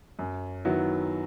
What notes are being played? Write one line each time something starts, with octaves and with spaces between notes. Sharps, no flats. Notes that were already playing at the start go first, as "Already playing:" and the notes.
F#2
D#3 F#3 B3 E4